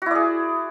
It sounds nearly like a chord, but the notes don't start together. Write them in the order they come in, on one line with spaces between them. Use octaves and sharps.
F#4 E4 D5 G#4